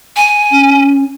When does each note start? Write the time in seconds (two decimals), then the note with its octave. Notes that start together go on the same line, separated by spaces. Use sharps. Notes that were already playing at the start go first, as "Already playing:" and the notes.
0.16 G#5
0.52 C#4